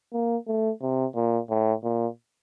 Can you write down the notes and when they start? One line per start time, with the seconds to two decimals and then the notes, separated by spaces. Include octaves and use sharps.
0.13 A#3
0.47 A3
0.82 C3
1.15 A#2
1.50 A2
1.83 A#2